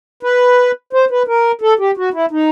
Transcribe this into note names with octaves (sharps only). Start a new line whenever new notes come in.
B4
C5
B4
A#4
A4
G4
F#4
E4
D#4